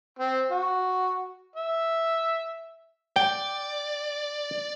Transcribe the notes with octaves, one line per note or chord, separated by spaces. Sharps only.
C4
F#4
E5
D5 G5